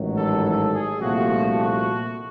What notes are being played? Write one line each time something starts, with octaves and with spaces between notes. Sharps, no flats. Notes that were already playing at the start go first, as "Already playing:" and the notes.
Already playing: A1 G#2 D#3 F#3
A4
A4
G#4
C2 A#2 F3 A3 F#4
F#4